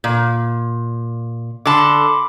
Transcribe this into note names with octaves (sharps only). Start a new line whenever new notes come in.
A#2
D3 A5 B5 C6 D6